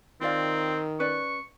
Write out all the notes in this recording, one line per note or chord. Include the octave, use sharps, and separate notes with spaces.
D#3 C4 F4 D5 F5
C#4 B4 D5 C#6